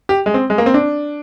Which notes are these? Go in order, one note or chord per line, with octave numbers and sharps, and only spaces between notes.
G4
G#3
C4
G#3
A#3
C4
D4